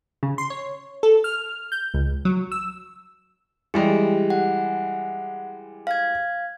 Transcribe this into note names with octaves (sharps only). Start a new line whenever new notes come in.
C#3
C6
C#5
A4
F6
G6
C#2
F#3
E6
E3 G3 G#3 G4
F#5
F5 G#6